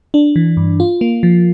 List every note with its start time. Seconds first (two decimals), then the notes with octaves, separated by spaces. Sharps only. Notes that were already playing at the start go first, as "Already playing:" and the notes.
0.14 D4
0.36 E3
0.57 G2
0.80 F4
1.01 A#3
1.23 F3